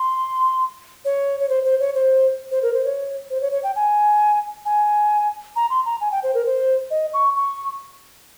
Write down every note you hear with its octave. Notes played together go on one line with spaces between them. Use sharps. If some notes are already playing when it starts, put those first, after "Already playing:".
Already playing: C6
C#5
C#5
C5
C5
C#5
C5
C5
A#4
C5
C#5
C5
C#5
C#5
G5
G#5
G#5
A#5
C6
A#5
G#5
G5
C5
A#4
C5
D#5
C#6
C#6